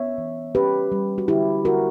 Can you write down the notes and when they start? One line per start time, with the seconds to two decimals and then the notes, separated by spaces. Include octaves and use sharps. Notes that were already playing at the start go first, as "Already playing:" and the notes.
Already playing: B3 C#5 E5
0.18 E3
0.55 C#4 G4 B4
0.92 G3
1.18 F#4
1.28 D3 E4 G4
1.65 D3 F#4 A#4